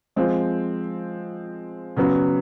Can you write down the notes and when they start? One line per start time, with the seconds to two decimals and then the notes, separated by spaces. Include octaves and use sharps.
0.16 F3 G#3 C4
1.97 C#3 F#3 B3